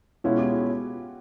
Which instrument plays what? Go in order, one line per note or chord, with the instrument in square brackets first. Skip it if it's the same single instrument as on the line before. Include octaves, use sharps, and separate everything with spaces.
[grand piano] B2 G#3 C#4 E4 [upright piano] F4
[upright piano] G4
F#4
F4